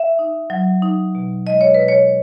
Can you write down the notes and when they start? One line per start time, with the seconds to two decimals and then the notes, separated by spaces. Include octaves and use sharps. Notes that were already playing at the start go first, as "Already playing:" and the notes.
Already playing: E5
0.19 D#4
0.50 F#3
0.82 D#4
1.15 B2
1.47 G#3 D#5
1.61 C#5
1.74 B2 B4
1.88 C#5